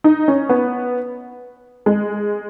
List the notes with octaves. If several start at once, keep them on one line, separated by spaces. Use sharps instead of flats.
D#4
C#4
B3
G#3